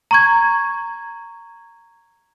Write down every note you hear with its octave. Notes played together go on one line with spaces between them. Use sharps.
A#5 C#6 G#6